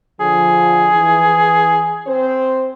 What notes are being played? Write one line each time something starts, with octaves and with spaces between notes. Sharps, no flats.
D3 F3 G#4
E3
C4 C5